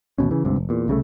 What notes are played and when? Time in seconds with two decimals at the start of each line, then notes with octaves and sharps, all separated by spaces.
0.18 A1 D#2 B2 C#4
0.31 C#3 E3
0.44 G1 C#2 G2 C3
0.56 F1
0.69 E2 A#2
0.88 C2 C#3 F3 A3